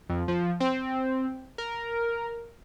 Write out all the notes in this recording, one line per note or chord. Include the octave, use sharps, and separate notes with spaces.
F2
F3
C4
A#4